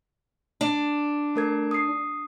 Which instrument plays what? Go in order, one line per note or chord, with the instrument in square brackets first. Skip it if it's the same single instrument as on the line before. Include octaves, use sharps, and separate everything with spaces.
[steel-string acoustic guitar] D4
[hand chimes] A3 A#4 G#6
D#6 C7